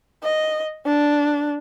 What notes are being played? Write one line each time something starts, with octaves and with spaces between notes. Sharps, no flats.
D#5
D4